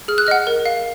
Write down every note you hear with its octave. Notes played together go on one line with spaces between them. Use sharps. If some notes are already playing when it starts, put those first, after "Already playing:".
G#4 F6
F#6
D#5 F#5 F6
A#4
F5